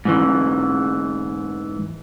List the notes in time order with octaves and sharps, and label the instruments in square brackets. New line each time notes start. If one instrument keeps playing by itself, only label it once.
[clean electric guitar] G#2 E3